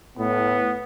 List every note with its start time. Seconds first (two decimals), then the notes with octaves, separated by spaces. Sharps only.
0.18 A2 B3